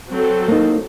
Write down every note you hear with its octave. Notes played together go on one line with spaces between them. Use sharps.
F#3 C4 A4
A#3 D#4